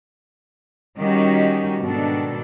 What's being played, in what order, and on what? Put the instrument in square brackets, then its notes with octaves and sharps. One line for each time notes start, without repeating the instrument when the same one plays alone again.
[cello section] D#3 G3 C#4 D#4 F#4 G4
G#2 B2 D#3 D4 A4